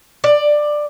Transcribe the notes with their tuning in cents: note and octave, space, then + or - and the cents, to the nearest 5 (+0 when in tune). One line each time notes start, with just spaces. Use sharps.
D5 +15